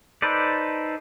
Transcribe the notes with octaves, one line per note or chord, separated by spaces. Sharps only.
D#4 A4 B4 C5 D5